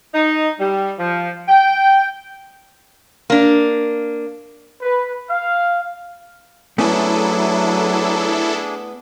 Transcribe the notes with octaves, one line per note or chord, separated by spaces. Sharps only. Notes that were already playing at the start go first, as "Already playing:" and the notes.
D#4
G3
F3
G5
A#3 D4
B4
F5
F#3 A3 B3 C#4 D4 E4 G#4 A4